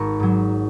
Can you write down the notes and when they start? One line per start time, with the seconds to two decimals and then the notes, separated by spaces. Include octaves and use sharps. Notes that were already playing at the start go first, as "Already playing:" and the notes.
Already playing: G#1 A#5 C#6
0.20 G#2 F#3